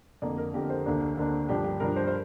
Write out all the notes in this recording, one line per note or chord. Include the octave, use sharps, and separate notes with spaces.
F2 D3 A#3 D5
A#4
F2 D3 A#3 G4
C5
D2 D3 A#3 D4
D2 D3 A#3 D4
G2 F3 D4 G4
G4
G2 F3 D4 A#4
C5
C5